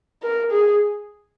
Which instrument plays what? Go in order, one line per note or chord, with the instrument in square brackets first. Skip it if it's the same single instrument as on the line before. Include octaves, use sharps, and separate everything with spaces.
[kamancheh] A#4
G#4